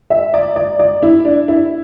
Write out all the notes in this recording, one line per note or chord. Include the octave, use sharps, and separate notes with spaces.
E5
D5
D5
D5
E4
D4
E4